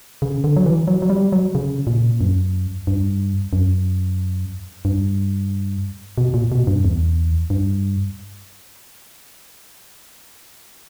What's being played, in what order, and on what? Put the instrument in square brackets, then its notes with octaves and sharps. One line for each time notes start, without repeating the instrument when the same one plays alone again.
[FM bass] C#3
D3
F#3
E3
F#3
F#3
G3
F#3
C#3
A#2
F#2
G2
F#2
G2
B2
A#2
B2
G2
E2
G2